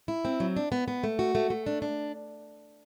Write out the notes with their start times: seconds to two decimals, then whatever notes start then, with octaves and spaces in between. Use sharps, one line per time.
0.08 E4
0.25 C4
0.40 F#3
0.56 D4
0.72 B3
0.88 B3
1.03 A3
1.19 F#4
1.35 A3
1.50 A3
1.66 D4
1.82 D4